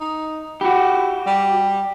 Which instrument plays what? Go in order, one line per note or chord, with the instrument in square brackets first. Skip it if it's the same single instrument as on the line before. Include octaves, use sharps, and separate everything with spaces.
[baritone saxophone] D#4
[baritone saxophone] E4 [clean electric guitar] F#4 G4
[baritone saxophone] G3